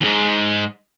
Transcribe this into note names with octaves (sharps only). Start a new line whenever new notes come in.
D#2 G#2